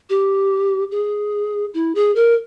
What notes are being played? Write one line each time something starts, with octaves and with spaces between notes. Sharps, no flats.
G4
G#4
E4
G#4
A#4